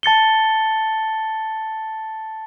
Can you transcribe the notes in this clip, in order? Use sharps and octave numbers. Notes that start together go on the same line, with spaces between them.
A5 A6 C#7 G7